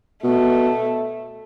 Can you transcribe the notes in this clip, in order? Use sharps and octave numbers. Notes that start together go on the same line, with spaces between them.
B2 A3